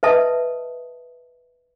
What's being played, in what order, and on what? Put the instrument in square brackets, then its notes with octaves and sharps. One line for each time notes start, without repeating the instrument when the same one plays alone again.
[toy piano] B4 D#5 E5 A5 D#6